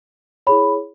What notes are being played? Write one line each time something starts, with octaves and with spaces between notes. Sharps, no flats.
E4 G#4 C#5 B5